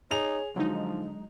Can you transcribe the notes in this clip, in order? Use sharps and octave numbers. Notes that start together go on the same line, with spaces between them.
D#4 G#4 C#5 F7
D3 F3 F#3 G#3 D#4